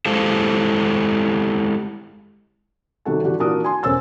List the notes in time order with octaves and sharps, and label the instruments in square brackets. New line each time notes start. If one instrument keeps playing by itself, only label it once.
[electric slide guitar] G#3 E4 G4 A4 C5 F5
[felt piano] C3 D#3 G3 F#4 A4
D3 E3 F#4 G4
A#2 E3 D4 F#4 A#4 D#6
G#5 C6
E1 C#4 A#4 C5 E6 A6